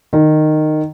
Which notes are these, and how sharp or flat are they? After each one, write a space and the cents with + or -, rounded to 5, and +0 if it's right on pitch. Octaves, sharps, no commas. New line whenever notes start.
D#3 -15